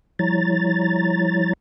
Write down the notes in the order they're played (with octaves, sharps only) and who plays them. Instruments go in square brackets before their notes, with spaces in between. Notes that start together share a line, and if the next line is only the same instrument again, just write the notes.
[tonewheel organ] F3 G3 E4 C#5 A#5 A6